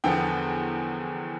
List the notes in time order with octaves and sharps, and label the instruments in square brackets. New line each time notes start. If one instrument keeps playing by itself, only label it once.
[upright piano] E2 D3 F3 B3 G5